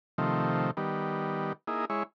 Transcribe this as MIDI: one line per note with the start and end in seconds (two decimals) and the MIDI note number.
0.18 0.71 48
0.18 0.71 51
0.18 0.71 53
0.18 0.71 57
0.77 1.53 51
0.77 1.53 55
0.77 1.53 59
1.67 1.85 58
1.67 1.85 63
1.67 1.85 64
1.67 1.85 68
1.90 2.03 56
1.90 2.03 64
1.90 2.03 73